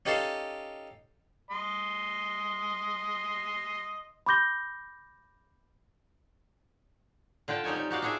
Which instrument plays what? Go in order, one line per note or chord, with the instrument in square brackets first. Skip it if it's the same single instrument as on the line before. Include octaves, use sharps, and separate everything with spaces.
[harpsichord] C#4 D#4 G4 A4 F5 A5
[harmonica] D#5 C6
[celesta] B5 C6 D6 G6 A#6 G7
[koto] D3 F4 G5 A5
G3 C4 D#4 C#5 G#5
D#4
D#4 F#4 D5 F5
D4 F4 F#4 G#4 E5